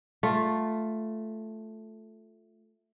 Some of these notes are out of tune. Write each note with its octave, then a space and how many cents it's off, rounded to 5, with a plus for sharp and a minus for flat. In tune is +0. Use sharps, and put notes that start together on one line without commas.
A3 +0 F4 +5